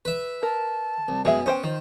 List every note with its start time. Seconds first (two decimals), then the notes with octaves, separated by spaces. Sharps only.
0.05 B4 E5
0.43 A#4 A5
1.08 C2
1.25 F#2 B2 G#3 G#4 E5 G#5
1.46 B3 C#4 C5 G5
1.64 D#3 F4 C5